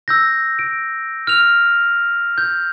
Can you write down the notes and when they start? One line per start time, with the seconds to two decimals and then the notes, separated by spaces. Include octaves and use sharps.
0.08 E6 G6 A#6
0.59 D7
1.27 F6 F7
2.38 G6